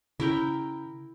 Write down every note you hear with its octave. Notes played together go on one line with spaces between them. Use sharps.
C#3 E4 A#4 G5